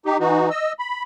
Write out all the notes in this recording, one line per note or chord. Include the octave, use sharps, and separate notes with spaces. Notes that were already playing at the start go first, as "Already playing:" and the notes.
D#4 G4
E3 D#4 F#4
D#5 E6
B5